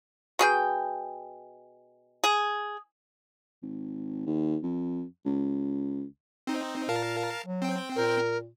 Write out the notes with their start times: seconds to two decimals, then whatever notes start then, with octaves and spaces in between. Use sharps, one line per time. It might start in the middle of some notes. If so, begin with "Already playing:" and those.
0.39 B2 G#4 G5
2.24 G#4
3.63 G#1
4.26 D#2
4.63 F2
5.25 C#2
6.47 C4 D#4
6.89 A#2 A#4 F5 A5
7.46 F#3
7.62 C4 G5
7.96 A#2 A#4